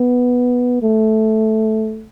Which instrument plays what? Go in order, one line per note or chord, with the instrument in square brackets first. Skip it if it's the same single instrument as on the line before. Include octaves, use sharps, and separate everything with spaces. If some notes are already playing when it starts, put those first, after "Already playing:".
Already playing: [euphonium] B3
A3